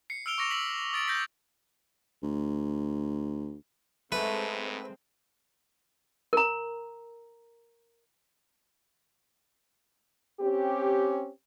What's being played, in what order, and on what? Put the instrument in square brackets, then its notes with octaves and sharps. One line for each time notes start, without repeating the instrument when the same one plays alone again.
[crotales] C7 C#7
E6 F6 D7 F7 G7
C#6 D6 A#6 C#7 F7
E6 B6 F#7
D#6 A6 D7
G6 A#6 B6
[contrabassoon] D2
[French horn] G#2 [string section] G#3 C4 [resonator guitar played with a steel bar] A3 [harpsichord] B4
[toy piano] A#4 A#5
[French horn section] C4 C#4 G4